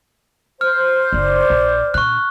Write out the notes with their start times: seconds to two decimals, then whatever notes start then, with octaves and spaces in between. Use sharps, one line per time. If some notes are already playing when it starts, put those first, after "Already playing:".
0.61 C5 F6
1.12 F#1 D#4 D5
1.50 A#1
1.94 A#2 D#3 C#6 F#6